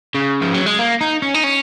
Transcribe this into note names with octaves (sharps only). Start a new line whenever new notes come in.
C#3
F3
F#3
G#3
A#3
D#4
C#4
D#4
C#4